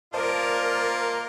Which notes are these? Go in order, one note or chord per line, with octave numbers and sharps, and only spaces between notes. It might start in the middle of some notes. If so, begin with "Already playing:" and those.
A#3 F4 A#4 C5 D5 D#5 A5